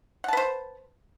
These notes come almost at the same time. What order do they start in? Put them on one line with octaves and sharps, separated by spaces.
F#5 A5 B4 C5